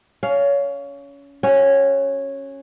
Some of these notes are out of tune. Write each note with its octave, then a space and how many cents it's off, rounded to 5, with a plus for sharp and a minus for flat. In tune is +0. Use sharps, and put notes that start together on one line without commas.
C#4 +25 F5 +0
C#4 -10 F#4 +30